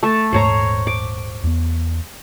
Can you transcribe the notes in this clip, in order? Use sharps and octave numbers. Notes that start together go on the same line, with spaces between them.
A3 A5
D#1 G#2 C5 C#5 A#5
D6
E2 B3